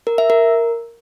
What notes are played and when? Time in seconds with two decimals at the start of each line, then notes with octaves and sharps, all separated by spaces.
0.07 A#4
0.18 E5
0.30 A#4